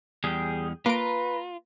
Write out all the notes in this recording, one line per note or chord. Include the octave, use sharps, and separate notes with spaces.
E2 G3 G#4 G5
A#3 F4 B4 A#5 D7